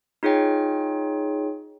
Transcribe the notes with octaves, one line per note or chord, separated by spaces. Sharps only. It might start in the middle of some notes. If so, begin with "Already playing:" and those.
D#4 F4 G#4 C#5 G5